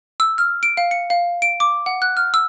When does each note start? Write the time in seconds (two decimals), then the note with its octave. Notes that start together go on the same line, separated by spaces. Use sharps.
0.20 E6
0.38 F6
0.63 D7
0.77 F5
0.91 C#7
1.10 F5
1.42 D7
1.60 D6
1.86 F#5
2.02 F#6
2.17 F6
2.34 E6